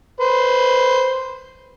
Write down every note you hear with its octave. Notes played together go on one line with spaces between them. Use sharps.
B4 C5